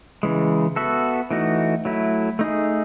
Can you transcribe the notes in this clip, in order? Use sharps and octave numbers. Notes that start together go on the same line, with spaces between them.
C#3 E3 G#3
B3 F#4 A4 E5
E3 A3 D#4 F#4
F#3 A3 E4
A3 D#4 G#4